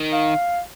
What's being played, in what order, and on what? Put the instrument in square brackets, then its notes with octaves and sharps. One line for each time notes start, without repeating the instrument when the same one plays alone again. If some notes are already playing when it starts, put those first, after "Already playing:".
Already playing: [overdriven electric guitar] D#3
[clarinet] F5